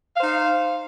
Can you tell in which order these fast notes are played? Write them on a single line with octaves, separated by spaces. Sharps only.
F5 C5 D#4